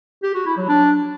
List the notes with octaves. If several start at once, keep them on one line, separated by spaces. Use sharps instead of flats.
G4
F#4
E4
F#3
D4